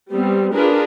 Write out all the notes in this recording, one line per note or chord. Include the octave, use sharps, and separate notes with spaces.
G3 B3 C4
D4 F4 G#4 A#4 B4